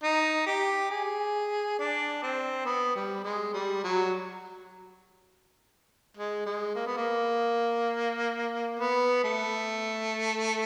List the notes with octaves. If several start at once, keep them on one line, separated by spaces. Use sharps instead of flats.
D#4
G4
G#4
D4
C4
B3
G3
G#3
G3
F#3
G#3
G#3
A#3
B3
A#3
B3
A3